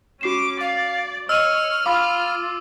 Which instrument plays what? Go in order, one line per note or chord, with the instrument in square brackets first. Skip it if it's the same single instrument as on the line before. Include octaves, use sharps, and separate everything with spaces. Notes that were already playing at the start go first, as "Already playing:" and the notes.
[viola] C#4 D6 [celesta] F#4 C7 E7
[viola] D5 [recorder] F5
[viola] C#5 [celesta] D#5 [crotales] E6 D#7 [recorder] F6
[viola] F4 [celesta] F5 B5 E6 [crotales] D6